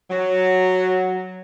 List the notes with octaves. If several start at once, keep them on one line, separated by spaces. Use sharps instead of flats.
F#3